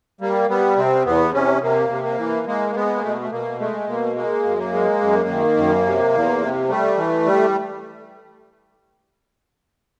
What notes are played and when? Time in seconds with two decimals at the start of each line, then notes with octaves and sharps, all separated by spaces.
0.21 G3 A#3
0.49 G3 B3
0.77 C3 C4
1.05 E2 B3
1.34 C3 C#4
1.62 C3 A#3
1.90 C3
2.04 A#3
2.18 E3
2.47 G#3 A#3
2.71 A#3
2.75 G#3 B3
2.96 A#3
3.03 B2 A3
3.21 A3
3.31 B2 A#3
3.59 G#3 A3
3.87 B2 A#3
4.16 G#3 A#3
4.44 F#2
4.59 A#3
4.72 G#3
5.01 F#2
5.28 D#3
5.57 F#2
5.86 C3
6.13 E2
6.41 C3
6.69 G3 A3
6.97 E3
7.26 G3